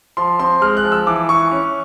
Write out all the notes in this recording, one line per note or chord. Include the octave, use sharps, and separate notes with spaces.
F3 C6
C4 C6
G#3 F6
F#6
F3
E6
E3 D6
E3 C#6
C#4